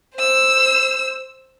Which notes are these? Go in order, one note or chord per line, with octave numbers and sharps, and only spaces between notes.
C5 E6